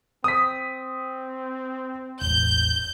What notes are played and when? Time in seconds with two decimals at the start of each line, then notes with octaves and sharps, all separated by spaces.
0.24 C4 D#6 B6
2.21 E1 A1 G6